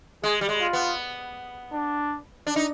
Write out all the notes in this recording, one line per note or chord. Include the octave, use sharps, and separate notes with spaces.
G#3 G#4
G3
G#3
F4
B3
D4
D4
D#4